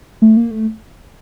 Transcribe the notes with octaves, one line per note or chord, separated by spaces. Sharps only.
A3
A#3
A3